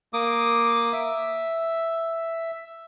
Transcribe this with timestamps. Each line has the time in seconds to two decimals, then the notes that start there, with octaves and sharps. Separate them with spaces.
0.13 A#3 D6 D#6
0.93 E5